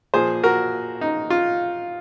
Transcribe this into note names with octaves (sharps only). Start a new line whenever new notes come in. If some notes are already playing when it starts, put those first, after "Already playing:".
A#2 F3 G#4 C5
F#4 A#4
D#4
F4